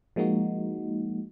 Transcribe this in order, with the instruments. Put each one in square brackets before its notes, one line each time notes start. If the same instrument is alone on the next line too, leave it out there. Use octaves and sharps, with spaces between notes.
[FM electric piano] F3 G#3 A#3 D#4 F#4